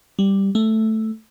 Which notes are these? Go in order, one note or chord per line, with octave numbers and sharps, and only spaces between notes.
G3
A3